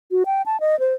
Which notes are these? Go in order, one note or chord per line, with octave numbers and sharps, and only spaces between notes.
F#4
G5
A5
D#5
C5